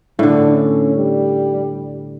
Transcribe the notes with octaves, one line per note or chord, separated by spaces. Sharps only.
A2 D3 D4
C#4
G3